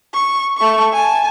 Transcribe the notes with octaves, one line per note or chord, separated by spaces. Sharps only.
C#6
A3 C#6
G#5 A5